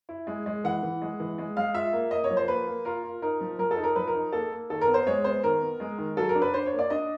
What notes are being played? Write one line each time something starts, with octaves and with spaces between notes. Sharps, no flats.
E4
G#3
G#3
E3 F#5
E3
G#3
E3
G#3
G#3 F5
F4 E5
A#3
A#3 D#5
C#5
F3
C5
A#3 B4
A#3
F4 A#4
F4
D#4 A#4
F3
F3 A#4
A4
D#4
A#4
F3 B4
A#4
D#4
A#3 A4
A#3
D#3 A4
A#4
B3
C5
G#3 C#5
B3 C5
D#3 A#4
B3
G#3
D#3
F#3 A4
A#4
D4
B4
D4 C5
C#5
A#3
D5
D4 D#5